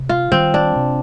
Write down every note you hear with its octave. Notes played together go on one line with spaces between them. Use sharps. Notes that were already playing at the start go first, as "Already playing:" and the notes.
Already playing: C3
F4
D#3 G3 C4
D4
C3